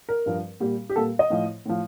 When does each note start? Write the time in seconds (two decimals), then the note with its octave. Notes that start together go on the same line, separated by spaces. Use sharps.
0.09 A#4
0.26 G2 F3
0.60 A#2 G3
0.90 G4
0.96 A#2 G3 A4
1.19 D#5
1.30 A2 F3
1.66 A2 F3